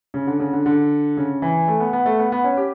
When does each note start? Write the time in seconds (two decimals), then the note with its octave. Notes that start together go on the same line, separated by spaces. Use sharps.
0.14 C#3
0.27 D3
0.39 C#3
0.53 D3
0.66 D3
1.17 C#3
1.42 E3
1.68 A3
1.80 B3
1.93 B3
2.06 A3
2.19 B3
2.32 B3
2.44 C#4
2.57 G4